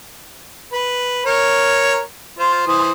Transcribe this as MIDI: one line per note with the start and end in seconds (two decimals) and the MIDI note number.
0.73 1.23 71
1.26 1.99 70
1.26 1.99 73
2.39 2.66 65
2.39 2.66 72
2.67 2.92 52
2.67 2.92 72
2.67 2.92 87